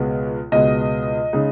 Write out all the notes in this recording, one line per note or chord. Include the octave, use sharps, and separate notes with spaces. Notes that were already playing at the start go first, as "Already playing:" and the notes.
Already playing: C#2 B2 G#3 B3
C#2 B2 G#3 B3 D#5
C#3 G#3 D#4